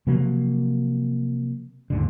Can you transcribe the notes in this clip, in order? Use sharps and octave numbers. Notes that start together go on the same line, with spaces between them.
C3 F3 F#3 A#3
D#2 G#2 D3